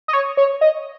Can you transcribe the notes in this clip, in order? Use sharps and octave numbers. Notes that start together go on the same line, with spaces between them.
D#5
C#5
C#5
D#5